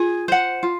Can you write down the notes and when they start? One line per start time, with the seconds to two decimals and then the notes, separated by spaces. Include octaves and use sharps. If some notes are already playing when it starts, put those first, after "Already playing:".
Already playing: F4 G#4
0.28 C5 F#5
0.63 F4